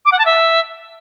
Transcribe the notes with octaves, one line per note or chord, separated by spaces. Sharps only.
D6
F#5
A5
E5